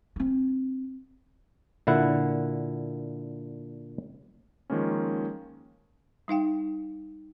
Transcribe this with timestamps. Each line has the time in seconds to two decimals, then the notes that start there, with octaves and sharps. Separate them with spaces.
0.16 C4 D4
1.87 A#2 D3 E4 F#5
4.70 D#3 F3 G#3 A#3 C#4
6.28 G3 D#4 F5 G5